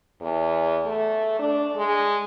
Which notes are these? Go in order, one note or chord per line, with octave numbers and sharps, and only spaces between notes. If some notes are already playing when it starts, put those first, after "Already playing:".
E2
A3
D4
G#3